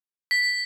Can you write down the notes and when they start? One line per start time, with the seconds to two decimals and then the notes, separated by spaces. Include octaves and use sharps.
0.31 B6